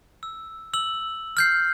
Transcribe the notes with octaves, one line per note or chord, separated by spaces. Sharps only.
E6
E6 F#7
F6 G6 C7